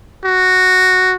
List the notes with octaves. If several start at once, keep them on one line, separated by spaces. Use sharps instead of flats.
F#4